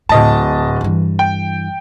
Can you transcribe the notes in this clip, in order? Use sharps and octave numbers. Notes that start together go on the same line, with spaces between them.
D1 A2 D#5 A5
G2 E3
G5